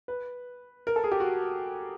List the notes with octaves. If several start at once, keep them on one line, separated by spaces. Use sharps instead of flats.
B4
A#4
A4
G#4
G4
F#4